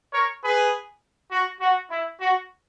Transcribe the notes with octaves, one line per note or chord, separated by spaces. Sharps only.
A#4 C#5
G#4 B4
F#4
F#4
E4
F#4